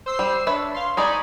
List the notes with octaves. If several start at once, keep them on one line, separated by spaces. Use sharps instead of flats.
C5 E6 C7
G3
D4 B4 C#5 E5
F5 C6
G#3 D#4 D5 G#5 B5 C#6